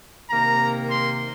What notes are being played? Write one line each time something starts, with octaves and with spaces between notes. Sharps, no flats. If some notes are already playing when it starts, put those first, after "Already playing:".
C3 D#3 A#3 A#5
C6